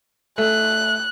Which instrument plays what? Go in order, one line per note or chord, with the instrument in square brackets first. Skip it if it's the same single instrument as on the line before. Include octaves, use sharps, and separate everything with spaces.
[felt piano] A3 [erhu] F#6